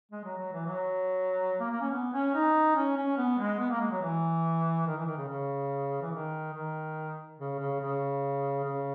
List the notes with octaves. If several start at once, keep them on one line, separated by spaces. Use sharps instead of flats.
G#3
F#3
F#3
E3
F#3
A#3
A#3
C#4
B3
C#4
D#4
C#4
C#4
B3
G#3
B3
A#3
G#3
F#3
E3
D#3
E3
D#3
C#3
C#3
E3
D#3
D#3
C#3
C#3
C#3
C#3